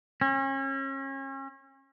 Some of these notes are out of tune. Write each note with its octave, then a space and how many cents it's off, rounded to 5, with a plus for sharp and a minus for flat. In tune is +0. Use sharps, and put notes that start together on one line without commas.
C#4 -35